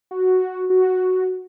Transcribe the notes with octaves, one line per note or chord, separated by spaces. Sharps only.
F#4
F#4